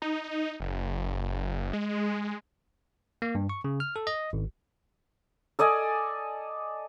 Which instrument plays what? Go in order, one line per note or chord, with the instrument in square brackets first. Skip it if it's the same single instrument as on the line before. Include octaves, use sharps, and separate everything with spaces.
[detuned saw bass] D#4
F#1
G#3
[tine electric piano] A#3
G2
C#6
C#3
F6
A4
D#5
G#1
[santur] A4 D5 D#5 G#5